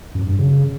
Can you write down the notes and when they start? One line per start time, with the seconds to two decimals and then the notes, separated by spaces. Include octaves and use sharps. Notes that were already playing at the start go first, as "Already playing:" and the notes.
0.15 F#2
0.27 G2
0.39 C#3